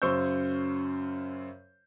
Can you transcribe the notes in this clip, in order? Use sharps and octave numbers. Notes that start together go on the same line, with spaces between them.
F#2 C#3 C5 C#6 E6 G6